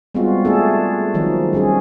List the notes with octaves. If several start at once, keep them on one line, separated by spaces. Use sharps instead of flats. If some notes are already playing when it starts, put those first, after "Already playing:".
G3 G#3 B3 C4 F4 F#4
A3 D4 G#4 A4
D#3 F3 F#3 D#4
G3 C#4 G#4